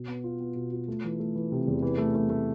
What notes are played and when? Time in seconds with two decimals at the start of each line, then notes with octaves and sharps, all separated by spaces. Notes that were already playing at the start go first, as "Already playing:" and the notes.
Already playing: B2
0.08 B3
0.24 F4
0.40 B3
0.56 B2
0.72 F4
0.88 A3
1.04 E3
1.20 A3
1.35 E3
1.52 C3
1.68 E2
1.82 E3
1.98 A3
2.15 A3
2.30 A3